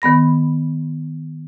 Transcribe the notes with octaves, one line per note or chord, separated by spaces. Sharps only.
D#3 B3 B5 A#6